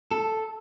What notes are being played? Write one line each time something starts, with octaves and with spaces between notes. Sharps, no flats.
A4